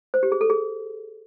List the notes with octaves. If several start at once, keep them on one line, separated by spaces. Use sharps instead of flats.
C5
G4
G#4
A4
G#4